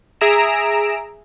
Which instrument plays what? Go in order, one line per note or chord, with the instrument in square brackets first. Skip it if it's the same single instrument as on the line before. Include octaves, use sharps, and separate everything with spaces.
[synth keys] G#4 E5 A#5 D7 E7